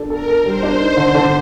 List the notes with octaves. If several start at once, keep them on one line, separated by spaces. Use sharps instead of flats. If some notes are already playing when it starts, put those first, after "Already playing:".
Already playing: D4 A4
A4 A#4
A4
G3 C5
D4
D#4
D3
D3